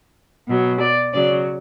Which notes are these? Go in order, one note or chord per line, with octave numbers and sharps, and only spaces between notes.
B2 F#3
D5
C#3 F#3 D5